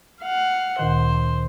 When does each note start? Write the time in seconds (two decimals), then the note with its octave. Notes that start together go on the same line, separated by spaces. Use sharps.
0.22 F5 F#5
0.79 D2 A#2 D#3 C5